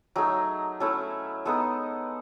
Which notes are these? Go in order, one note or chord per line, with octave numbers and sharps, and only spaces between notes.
F#3 A3 D#4 G#4
F#3 A3 C#4 E4 A4
G#3 B3 D#4 A4